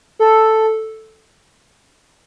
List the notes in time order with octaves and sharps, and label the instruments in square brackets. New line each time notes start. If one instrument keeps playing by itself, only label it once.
[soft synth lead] A4